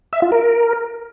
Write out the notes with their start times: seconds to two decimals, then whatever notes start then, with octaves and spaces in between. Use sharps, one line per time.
0.13 E5
0.22 F4
0.32 A#4